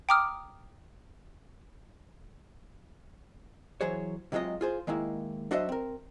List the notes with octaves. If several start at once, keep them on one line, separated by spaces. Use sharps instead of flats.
G5 A#5 D6 D#6 F6
E3 F#3 G#4 C5 C#5
C3 F#3 G#3 F4 D#5
F4 G#4 C5
D#3 G#3 A#3 E4
F#3 D4 F#4 C5 D#5 E5
C4 A#4